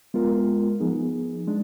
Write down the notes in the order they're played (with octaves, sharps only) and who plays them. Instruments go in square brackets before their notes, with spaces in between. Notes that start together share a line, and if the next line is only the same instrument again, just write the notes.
[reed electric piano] G#3 B3 F4 A#4
F3 B3 D#4 G#4
G#3 D4